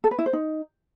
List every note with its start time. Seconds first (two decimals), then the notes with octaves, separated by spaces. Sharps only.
0.04 A4
0.11 B4
0.19 E4
0.26 C5
0.33 D#4